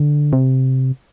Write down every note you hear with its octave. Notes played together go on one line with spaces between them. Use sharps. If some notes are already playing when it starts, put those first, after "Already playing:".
Already playing: D3
C3